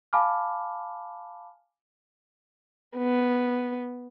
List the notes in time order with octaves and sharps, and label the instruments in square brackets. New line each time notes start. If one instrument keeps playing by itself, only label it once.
[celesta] F5 G#5 A5 B5 D6 F6
[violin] B3